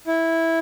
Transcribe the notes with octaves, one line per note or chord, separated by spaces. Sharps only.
E4